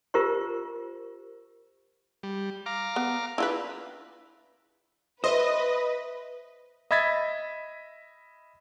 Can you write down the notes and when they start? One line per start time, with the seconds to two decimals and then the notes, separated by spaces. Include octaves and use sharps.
0.14 F4 G4 A#4 C5 C#6
2.23 G3
2.66 F5 A#5 D6
2.96 B3
3.38 D4 E4 F4 B4
5.24 B4 C5 D#5 E5
6.91 D#5 E5 B5 G#6 A6 B6